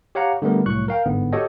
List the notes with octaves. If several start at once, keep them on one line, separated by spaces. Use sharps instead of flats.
G4 C#5 F5 F#5 A#5
D3 G3 A3 B3 A#4
C2 A2 F#3 C#6 F#6
A#4 F5 G5
G1 G#2 D3 B3
F#4 G4 A4 C#5 D#5 G5